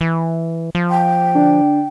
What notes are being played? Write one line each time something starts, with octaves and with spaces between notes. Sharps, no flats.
E3
F3
G5
D3 D4